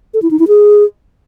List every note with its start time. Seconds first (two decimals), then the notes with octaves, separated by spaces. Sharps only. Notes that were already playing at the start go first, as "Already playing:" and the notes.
0.14 A4
0.22 E4
0.31 D#4
0.39 E4
0.48 G#4